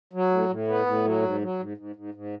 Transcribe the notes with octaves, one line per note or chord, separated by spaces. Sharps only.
F#3
A2
A2
B3
A2
F#3
G#2
F#3
G#2
G#2
G#2
G#2